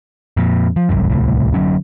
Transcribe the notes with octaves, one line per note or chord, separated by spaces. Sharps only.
F2 A#2
F3
G1 C2 F#2
D1 C2 A2
D3 F#3 C#4